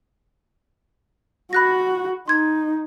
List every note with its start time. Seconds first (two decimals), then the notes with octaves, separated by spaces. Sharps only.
1.53 F#4 B5 F#6 A#6
2.28 D#4 C6 G#6